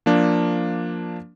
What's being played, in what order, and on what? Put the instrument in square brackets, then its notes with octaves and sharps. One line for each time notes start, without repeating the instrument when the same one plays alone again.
[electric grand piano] F3 A#3 D4